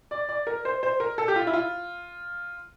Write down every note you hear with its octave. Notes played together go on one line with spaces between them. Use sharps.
D5
D5
A#4
C5
C5
A#4
A4
G4
F4
E4
F4